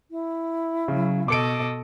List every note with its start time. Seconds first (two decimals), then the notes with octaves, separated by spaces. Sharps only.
0.10 E4
0.88 C#3 F#3
1.28 B2 A4 D#5 D6 C#7 D7